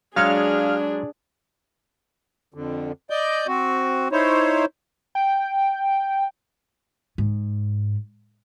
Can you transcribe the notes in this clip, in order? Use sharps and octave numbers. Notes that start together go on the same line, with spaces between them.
F#3 G#3 D4 G#4 C#5 F5 F6
F2 D3
D5 D#5 G6
C4 F#4
D#4 E4 C5 C#5
G5
G#2